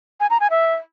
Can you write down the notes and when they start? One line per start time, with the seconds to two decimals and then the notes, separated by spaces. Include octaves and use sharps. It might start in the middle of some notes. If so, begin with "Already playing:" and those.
0.20 G#5
0.30 A#5
0.40 G#5
0.50 E5